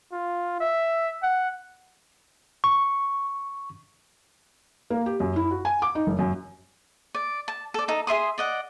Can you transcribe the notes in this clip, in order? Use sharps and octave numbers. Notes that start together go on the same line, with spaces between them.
F4
E5
F#5
C#6
A#3
G4
F#2
E4
F#4
G#5
D6
D#4
F#1
F#2
D5
A5
A4 D5
D#4 A4
G#4 E5 C6 D#6
D5 D#5 F#5